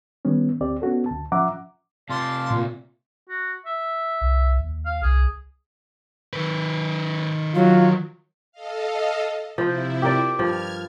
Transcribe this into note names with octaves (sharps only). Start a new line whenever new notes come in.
D#3 G3 B3 C#4
D2 C4 G4 D5
B3 C#4 F#4 A4
D2 A5
F3 C#4 E5 F#5 A#5 D6
C3 F4 D5 F5 A5 C6
A#2
F#4
E5
C2
D#2
F5
C2 G#4
D#3 B4
F#3 F4
A4 D#5 F5
C3 F3 E4 C5
G4 A#4 D5
G2 F3 F6 G#6